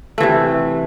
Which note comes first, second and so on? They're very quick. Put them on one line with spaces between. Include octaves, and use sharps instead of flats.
A3 E3 C3